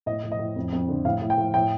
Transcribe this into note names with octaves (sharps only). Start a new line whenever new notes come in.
A2 D#5
A2
D#5
A2
F2
F2
D3
A2 F5
A2
G5
A2
A2 G5